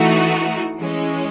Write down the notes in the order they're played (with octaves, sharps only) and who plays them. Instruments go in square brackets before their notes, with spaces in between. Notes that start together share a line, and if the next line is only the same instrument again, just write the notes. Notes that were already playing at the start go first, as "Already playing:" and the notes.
Already playing: [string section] E3 A3 D#4 F#4
E3 G#3 C#4